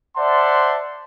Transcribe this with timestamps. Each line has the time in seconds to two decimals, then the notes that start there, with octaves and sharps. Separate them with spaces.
0.17 C5 D5 E5 F#5 A5 C6